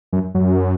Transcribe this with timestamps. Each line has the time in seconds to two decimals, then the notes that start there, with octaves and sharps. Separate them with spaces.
0.13 F#2
0.35 F#2